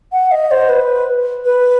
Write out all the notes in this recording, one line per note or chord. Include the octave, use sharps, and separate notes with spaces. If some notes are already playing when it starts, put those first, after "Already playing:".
F#5
D#5
C5
B4
B4